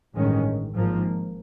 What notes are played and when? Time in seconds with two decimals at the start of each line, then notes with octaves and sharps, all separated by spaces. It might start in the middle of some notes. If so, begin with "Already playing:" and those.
0.15 A1 G2 D#3 G#3 C#4
0.75 G#1 G#2 F3 A#3